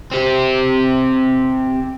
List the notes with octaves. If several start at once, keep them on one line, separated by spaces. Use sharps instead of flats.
C4 G4